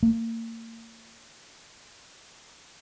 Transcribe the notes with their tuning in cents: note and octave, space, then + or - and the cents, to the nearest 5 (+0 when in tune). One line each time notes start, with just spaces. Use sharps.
A#3 -35